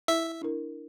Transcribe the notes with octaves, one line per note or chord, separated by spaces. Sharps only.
E4 E5
D4 E4 A#4